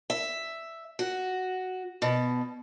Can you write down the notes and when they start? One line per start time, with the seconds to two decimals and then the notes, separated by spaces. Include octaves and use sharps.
0.10 E5
0.99 F#4
2.02 B2